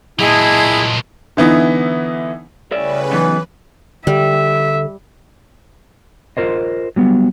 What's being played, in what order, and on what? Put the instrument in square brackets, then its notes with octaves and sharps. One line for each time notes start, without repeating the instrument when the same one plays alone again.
[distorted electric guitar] A#2 F#3 [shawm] E4 [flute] G#4 [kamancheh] D#5 A5
[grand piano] D3 E3 B3 D#4 E4
[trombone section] A2 G3 C#4 [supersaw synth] C#3 B4 [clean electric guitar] D5 E5
[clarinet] E3 [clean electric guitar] F#3 B3 D#4
[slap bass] D3 [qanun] G3 [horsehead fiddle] E5
[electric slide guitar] F4 A#4 C5 D#5
F#3 G3 B3